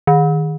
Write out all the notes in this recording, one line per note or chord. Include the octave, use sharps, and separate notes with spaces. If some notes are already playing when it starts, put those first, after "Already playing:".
D#3